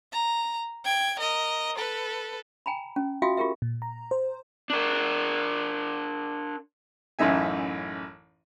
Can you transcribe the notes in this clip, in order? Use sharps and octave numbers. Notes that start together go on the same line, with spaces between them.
A#5
G5 G#6
A#4 D#5
A4 B4
G5 G#5 A#5 B5
C#4
F4 F#4 E5 F5 G5 D#6
F4 G4 G#4 A#4 E5
A#2
A#5
C5
D4 A#4
A1 F#2 E3 D#4 E5 G#5